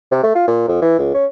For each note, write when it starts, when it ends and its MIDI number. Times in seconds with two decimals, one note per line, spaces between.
0.12 0.21 48
0.23 0.33 57
0.35 0.43 65
0.47 0.63 46
0.68 0.77 41
0.82 0.98 52
0.98 1.11 37
1.14 1.26 61